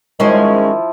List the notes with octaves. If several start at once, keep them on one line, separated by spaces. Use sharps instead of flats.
D#3 F3 G#3 C#4 E4 C5